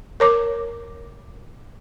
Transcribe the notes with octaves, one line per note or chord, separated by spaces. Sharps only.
A#4 C#5 D6